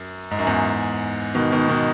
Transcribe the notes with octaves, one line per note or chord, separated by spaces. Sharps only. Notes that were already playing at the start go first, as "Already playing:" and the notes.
Already playing: F#2
G#2
F#2
E2 G#2
B2 D#3
B2 D#3
B2 D#3